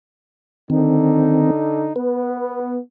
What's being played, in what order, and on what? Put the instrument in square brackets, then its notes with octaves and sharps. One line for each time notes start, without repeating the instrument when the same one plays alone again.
[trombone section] D3 D#4 [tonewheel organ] D#3 C4
[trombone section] B3 [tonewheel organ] B4